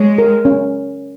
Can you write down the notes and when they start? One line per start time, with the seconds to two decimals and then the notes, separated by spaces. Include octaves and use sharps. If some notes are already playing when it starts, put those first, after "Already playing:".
Already playing: G#3 C#5
0.18 A#4
0.45 C#4